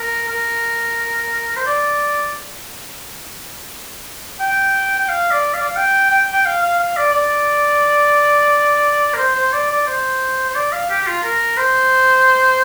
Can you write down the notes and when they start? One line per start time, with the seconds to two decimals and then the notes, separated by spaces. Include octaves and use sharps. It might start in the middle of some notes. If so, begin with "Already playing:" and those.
Already playing: A#4
0.29 A#4
1.56 C5
1.66 D5
4.40 G5
4.99 G5
5.09 F5
5.31 D5
5.54 F5
5.61 D5
5.68 F5
5.77 G5
6.11 G5
6.32 G5
6.45 F5
6.62 F5
6.79 F5
6.97 D5
7.13 D5
9.14 A#4
9.18 C5
9.36 C5
9.53 D5
9.70 D5
9.87 C5
10.50 C5
10.55 D5
10.73 F5
10.90 G4
11.01 G4
11.07 F4
11.23 A#4
11.57 C5